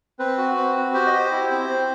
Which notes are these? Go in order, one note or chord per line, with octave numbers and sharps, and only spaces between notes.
C4 B4
F#4
C4
F#4
G4 C5
D#5
G4
C5
E4
C4
C4